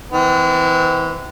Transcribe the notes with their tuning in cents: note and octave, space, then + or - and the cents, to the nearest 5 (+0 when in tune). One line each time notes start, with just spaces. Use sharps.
E3 -25 C4 -45